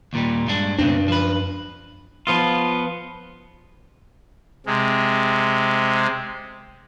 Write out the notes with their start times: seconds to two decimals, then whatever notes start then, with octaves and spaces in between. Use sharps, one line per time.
0.13 D#2 A#2 G3
0.47 G2 G#3 D4
0.79 C#2 F#2 B2 C4 D4
1.08 F3 B4
2.27 F3 B3 F4
4.66 C3 G#3